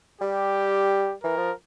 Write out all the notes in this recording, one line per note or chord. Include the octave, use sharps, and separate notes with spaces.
G3 G4
E3 A#4
F3